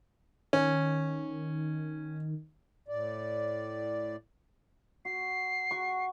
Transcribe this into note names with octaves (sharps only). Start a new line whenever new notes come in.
D#3 C#4
A2 D5
F#4 C7
F#4 C#6